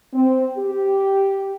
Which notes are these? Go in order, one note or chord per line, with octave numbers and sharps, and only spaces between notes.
C4
G4